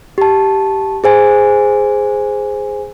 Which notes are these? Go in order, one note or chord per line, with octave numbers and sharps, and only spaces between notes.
G4 A5
G#4 C5 G#5